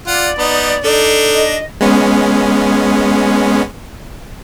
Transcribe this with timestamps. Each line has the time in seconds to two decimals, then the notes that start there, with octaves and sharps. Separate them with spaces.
0.07 F4 D5 F#5
0.38 B3 D#4
0.84 D4 D#4 A4
1.31 D#5
1.81 G#3 B3 C#4